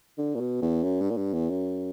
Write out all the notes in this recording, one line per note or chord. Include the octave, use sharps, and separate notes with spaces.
D3
A#2
B2
E2
F#2
G2
A#2
G2
E2
F#2